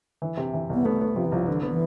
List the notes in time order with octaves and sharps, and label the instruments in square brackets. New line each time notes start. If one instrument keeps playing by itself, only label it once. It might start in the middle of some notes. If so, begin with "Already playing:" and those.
[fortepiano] E3
C3
E3
[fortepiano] C2 [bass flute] B3
[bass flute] A3 [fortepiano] B3
[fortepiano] B3
[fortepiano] C3 [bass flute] F3
[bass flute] E3
[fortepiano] C2 [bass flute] F3
[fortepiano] D3 [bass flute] E3
[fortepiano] B3
[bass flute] E3